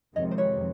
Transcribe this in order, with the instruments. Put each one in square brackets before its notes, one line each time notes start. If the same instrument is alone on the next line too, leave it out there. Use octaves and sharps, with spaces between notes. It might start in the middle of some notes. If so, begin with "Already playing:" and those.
[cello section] F2 C3 D#3 G#3 [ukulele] C#5 D#5
[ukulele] C5
B4 C#5